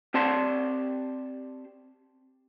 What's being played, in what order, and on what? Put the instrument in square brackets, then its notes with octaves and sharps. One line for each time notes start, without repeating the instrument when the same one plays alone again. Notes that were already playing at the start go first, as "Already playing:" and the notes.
[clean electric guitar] C4 G4 D5 A5 C6